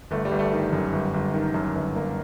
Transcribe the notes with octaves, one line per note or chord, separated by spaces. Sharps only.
G1 A3
G3
G1
A3
D#3
F#2
G1
G1
D#3
F#2
G1
G1 A#3